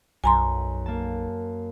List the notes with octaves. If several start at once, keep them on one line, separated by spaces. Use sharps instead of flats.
B1 F#2 G#5 A#5 C6
A#3 A5